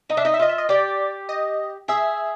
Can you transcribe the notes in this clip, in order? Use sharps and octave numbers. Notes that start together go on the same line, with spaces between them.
D#4 D#5
D4 E5
D#4 D#5
E5
F4 D#5
E5
D#5
G4 D5
D#5
G#4 E5